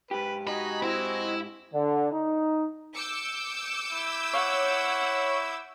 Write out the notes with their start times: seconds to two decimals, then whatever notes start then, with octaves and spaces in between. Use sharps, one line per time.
0.11 G#2 G4 B4
0.47 D#4 F#4 D#5 G#5 B5
0.82 C4 E4
1.72 D3
2.12 D#4
2.95 D6 E6 G6 C#7
3.92 E4
4.33 C#5 F#5